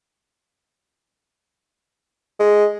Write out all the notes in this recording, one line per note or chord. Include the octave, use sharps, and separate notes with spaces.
G#3